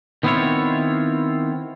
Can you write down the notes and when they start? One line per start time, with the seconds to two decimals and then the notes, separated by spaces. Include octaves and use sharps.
0.23 D#3 B3 C4 E4 F4 C#5